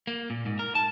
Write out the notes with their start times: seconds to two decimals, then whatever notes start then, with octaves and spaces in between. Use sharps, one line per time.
0.07 A#3
0.30 A#2
0.46 G#2
0.59 A#4
0.75 A5